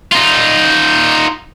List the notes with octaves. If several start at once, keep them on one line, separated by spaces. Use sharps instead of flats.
D#4 F4